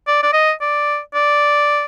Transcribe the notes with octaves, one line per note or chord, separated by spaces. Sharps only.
D5
D5
D#5
D5
D5